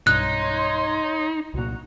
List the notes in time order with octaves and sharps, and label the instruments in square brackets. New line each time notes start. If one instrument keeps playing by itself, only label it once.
[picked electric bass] B1 G2 B2 [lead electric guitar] D#4 [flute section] C#5 C6 [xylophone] F#6
[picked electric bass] C2 A#2 [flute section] F#4 A#5